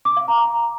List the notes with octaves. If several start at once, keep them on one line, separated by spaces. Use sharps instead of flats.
D6
F5
A#5